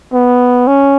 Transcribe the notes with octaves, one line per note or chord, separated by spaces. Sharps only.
B3
C#4